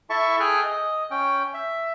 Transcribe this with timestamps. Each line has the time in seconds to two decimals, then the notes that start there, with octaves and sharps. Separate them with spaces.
0.10 E4 A4 E5 A5 C#6
0.40 G#4 A4 G5 G#5 F6 F#6
0.64 D#5
1.11 C#4 G5
1.54 E5